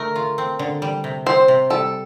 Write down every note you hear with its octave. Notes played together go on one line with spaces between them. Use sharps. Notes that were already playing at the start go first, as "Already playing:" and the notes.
Already playing: D3 A3 A#4
F4
C4
D3
G3
C3
C4 C5
C3
G3 A4